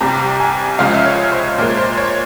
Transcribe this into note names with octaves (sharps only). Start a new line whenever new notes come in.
C2 C3 G3 A#5
G#5
C#2 C#3 F3 G#3 F5
E5
C#5
C5
A#2 G#3 A#4
C5
C#5